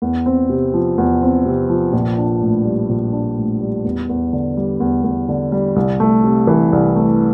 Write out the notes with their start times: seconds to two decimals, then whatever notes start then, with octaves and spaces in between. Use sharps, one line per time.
0.02 E2
0.26 C4
0.49 C3
0.74 F3
0.98 E2
1.22 C4
1.46 C3
1.69 F3
1.93 A#1
2.18 D4
2.41 A2
2.65 G3
2.89 A#1
3.12 D4
3.36 A2
3.61 G3
3.84 E2
4.09 E2
4.33 D3
4.57 G3
4.80 E2
5.04 E2
5.29 D3
5.52 G3
5.76 C2
6.00 A3
6.24 C3
6.47 E3
6.73 C2
6.96 A3